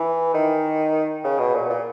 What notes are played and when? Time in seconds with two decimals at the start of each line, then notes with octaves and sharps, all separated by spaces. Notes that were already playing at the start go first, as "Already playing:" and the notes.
Already playing: E3
0.34 D#3
1.24 C#3
1.39 B2
1.55 A#2
1.70 A#2